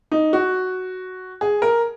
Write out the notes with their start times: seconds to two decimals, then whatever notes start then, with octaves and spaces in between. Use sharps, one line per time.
0.12 D#4
0.33 F#4
1.41 G#4
1.62 A#4